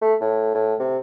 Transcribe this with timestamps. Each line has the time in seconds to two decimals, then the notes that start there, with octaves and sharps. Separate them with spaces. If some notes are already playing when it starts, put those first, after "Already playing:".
0.02 A3
0.21 A2
0.55 A2
0.80 C3